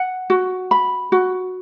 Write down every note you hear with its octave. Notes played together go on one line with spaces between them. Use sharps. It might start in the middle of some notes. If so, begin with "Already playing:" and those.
Already playing: F#5
F#4
B5
F#4